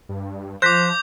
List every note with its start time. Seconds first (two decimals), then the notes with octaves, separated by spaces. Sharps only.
0.09 G2
0.62 F3 C5 D6 F#6 G6 A#6 B6